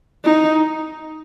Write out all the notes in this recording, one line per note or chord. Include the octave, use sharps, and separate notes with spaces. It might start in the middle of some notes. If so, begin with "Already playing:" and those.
D#4